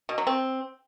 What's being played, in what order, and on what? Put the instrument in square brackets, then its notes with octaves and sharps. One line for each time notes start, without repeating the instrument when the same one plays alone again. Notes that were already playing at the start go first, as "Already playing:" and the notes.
[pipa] B2
F#3
C4